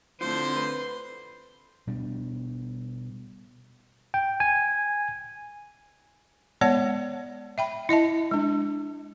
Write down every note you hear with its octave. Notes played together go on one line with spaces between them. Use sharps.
F2 A2 D3 F3 C5 C6
B4
B2 G3 D4
G5
G#5
G#3 B3 C#5 D5 F#5 A5
E5 G5 B5
E4 D#5 E5 A5
G#3 D4